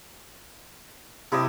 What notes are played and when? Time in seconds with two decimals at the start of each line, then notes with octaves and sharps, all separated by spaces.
1.32 C3 E4 G4 D#5